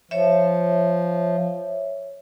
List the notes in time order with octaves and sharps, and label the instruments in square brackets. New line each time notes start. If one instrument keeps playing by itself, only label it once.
[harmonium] F3 [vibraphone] C#5 E5